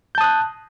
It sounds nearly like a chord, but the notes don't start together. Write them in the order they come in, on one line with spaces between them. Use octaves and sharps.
G6 A5 D#6 F#6